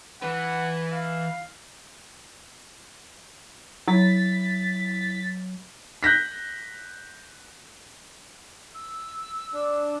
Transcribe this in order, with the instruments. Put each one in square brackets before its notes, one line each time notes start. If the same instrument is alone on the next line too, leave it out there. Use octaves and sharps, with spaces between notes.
[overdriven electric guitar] E3 B4 [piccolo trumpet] F#5
[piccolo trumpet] F5
[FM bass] F#3 [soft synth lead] E4 [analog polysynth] A6 B6
[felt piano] F#6 G6 A#6 B6
[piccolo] E6
[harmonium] D4